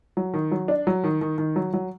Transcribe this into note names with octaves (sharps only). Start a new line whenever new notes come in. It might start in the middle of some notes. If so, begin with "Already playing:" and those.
F#3
D#3
F#3
D4
F#3
D#3
D#3
D#3
F#3
F#3